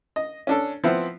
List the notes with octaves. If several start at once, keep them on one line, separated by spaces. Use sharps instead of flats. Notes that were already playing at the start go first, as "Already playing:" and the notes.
D#5
C#4 D4 A4
F3 B3 C4 E4